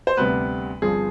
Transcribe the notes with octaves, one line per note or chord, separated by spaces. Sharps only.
C5
D2 C3 G3 B3 B4
G1 G2 F3 C4 G#4